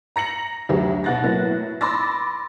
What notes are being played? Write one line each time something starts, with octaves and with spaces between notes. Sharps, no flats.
A#5 A#6 C#7 F#7
D2 F#3 G4 G#4
B2 F#5 F#6 A6 A#6
A2 F#3 A#3 B3
B5 C6 D6 E6 A6 A#6